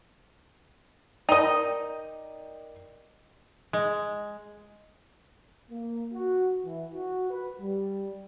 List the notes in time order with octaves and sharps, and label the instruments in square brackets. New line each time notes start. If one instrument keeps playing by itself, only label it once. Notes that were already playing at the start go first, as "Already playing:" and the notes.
[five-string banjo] D#4 D#5 [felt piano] A#4 D5 G5
[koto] G#3
[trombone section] A#3
F#4
E3
F#4
B4
G3